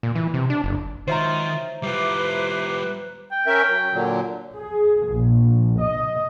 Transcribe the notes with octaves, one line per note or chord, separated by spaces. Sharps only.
A#2
E3
C3
D4
F#1
D#3 F#3 G#3 F4 C5 E5 A#5
G3 E4 F4 B4 C6 D6
G5
C#4 A#4 E5
F#3
A#2 D3 F#3
G#4
A#1
D#5